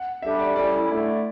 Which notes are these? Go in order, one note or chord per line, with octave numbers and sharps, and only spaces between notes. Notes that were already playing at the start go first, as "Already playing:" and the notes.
Already playing: F#5
D3 G3 D4 G4 E5
D5
A2 G3 C#4 E4 D5
D3 A3 E4